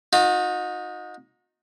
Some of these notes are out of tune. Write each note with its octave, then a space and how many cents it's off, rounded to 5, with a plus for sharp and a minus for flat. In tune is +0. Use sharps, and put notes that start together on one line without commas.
D#4 +0 F#4 -40